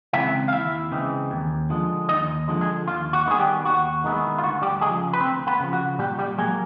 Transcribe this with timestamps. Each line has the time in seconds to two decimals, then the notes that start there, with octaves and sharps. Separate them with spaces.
0.13 C#3 E3 G#3 C4 E4 E5
0.48 F5
0.53 D#2 E4 E5
0.92 C#3 E3 G#3 C4
1.31 D#2
1.70 D3 F3 G#3
2.09 D#2 D#4 D#5
2.48 D3 F3 G#3
2.61 G#3 G#4
2.87 D#2 F4
3.13 F#4
3.26 D#3 G#3 B3 E4
3.31 G#4
3.39 G3 G4
3.65 D#2 F#4
4.04 D#3 G#3 B3 E4
4.38 F4
4.43 D2 F#4
4.62 G3 G4
4.81 C#3 F3 G#3 G#4
5.13 B4
5.20 D2 C4 C5
5.47 B3 B4
5.60 C#3 F3
5.73 F#4
5.99 A#2 G3 G4
6.18 G3 G4
6.38 F#3 G#3 A#3 G#4